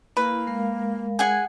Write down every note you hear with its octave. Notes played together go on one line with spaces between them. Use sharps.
A#3 E4 B4
G#3 A#4 F5
G#4 F#5 G#5